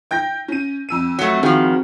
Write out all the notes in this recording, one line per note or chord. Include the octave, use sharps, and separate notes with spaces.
G5 G6 A#6
C#4 D#7
F2 E6 D#7
F#3 A3
D#3 F3 C4 F#4 G#4